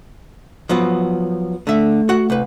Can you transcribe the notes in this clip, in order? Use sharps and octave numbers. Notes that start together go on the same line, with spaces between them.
F3 F#3 B3
D3 A3 E5
F#4 F#5
C2 B4